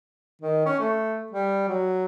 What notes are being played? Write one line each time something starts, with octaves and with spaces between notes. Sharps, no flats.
D#3
C#4
A3
G3
F#3